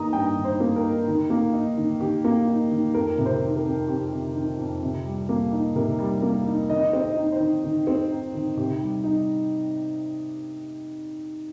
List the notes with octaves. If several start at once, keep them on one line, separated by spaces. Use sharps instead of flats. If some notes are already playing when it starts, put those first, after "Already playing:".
Already playing: G2 D#3 A#3 D#4 A#5 D#6
G2 G5
D#3
C5
A#3
A#4
D#4
D#3
A#3
D#4
D#3
D#3 G4
A#3
D#4
D#3
F2 A#4
C3 A#4
C5
D#3
A#4
F2
F2 G4
C3
D#3
F2
C3
G3
A#3
D#4
C3 A#4
G3
A#3
D#4
D#3 D#5
C4
D#5
D#4
C5
D#3
D#3
C4
D#4
D#3
C3 G4
G3
D#4